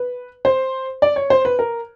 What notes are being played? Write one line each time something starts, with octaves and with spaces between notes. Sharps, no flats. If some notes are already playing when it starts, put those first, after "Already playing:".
Already playing: B4
C5
D5
C#5
C5
B4
A#4